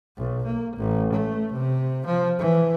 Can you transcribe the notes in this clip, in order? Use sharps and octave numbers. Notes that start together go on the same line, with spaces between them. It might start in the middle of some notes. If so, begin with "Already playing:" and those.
B1
A#3
A1
A3
C3
F3
E3